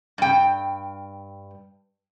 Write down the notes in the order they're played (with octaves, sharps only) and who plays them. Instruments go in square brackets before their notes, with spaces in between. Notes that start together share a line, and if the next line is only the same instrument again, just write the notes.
[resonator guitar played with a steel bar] G2 G5